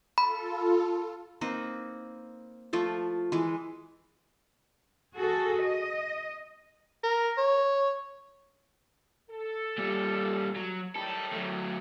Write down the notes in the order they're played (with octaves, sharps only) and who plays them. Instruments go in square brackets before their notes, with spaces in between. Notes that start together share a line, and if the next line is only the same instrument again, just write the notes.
[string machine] F4 A4 [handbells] B5
[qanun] A#3 C4 D#4 B4
F3 A3 F4
E3 G#3
[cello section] F#4 G#4 A4
D#5
[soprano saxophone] A#4
C#5
[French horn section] A4
[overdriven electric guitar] A#2 G3
F#3
[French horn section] A2 D#3 G3 [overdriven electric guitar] A4
[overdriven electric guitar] F#3 A3